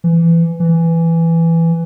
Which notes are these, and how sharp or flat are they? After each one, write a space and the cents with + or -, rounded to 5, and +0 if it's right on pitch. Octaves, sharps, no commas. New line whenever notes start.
E3 +20
E3 +10